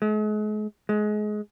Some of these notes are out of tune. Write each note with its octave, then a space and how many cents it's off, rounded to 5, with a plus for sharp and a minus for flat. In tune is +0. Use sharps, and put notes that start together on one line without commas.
G#3 +40
G#3 +25